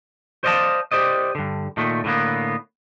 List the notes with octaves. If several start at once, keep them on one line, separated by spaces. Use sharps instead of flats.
C5 D5 D#5 F5 A5
G4 C5 D5 D#5
G2 D3
A#2 D#3 A3
A2 D3 A#3 B3